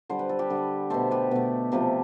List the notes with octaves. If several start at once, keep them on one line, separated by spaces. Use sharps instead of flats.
D3 G3 C5
B4
A4
G4 B4
D3 G3
B2 A3 A4 C5
G4 B4
B2 A3
C3 F3 A3 G4 B4